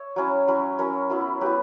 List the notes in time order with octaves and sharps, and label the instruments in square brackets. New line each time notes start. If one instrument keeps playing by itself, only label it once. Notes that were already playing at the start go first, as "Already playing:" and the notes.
Already playing: [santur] C#5 E5
F#3 C#4 E4
F#3 C#4 E4
F#3 C#4 E4 A#4 C#5
F#3 B3 E4
F#3 B3 E4 G4 B4